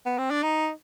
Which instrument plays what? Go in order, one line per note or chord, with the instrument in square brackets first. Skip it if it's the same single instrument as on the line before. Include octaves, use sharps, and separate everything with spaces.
[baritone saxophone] B3
C4
D4
D#4